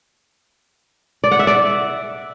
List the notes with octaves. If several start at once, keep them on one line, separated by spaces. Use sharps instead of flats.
D5
F#5
E5
D5